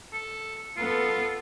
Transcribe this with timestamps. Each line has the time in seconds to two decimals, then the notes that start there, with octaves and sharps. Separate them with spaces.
0.13 A4
0.77 B3 F4 A4